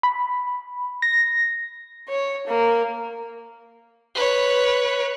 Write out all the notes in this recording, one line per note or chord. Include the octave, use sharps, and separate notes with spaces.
B5
A#6
C#5
A#3
B4 C#5